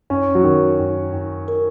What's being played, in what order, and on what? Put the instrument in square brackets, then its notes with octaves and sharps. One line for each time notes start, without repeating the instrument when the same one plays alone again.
[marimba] F#2 [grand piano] C#4
[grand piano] F#3
[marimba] F#2 [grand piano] D#3
[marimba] F#2
F#2
A#4